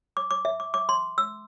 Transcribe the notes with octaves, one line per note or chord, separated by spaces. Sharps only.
D6
D6
E5
D6
D6
C6
E6